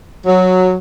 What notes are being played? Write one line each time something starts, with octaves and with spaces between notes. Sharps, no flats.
F#3